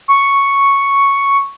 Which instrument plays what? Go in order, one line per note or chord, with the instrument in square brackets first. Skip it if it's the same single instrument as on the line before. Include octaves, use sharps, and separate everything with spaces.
[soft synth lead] C#6